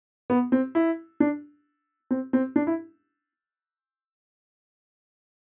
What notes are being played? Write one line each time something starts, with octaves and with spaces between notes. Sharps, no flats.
B3
C4
E4
D4
C4
C4
D4
E4